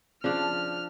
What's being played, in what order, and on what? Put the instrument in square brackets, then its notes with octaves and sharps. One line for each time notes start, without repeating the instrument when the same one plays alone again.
[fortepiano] C#3 [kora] F3 D4 [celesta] D5 A5 F7 [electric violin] F6